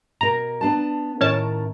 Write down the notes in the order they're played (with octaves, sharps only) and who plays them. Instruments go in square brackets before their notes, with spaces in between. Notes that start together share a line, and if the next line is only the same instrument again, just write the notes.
[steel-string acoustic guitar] B2 A#4 [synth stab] A#5
[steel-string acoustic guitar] B3 D4 A5
[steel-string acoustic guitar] A2 D#3 A#4 [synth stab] C#4 C#5 A5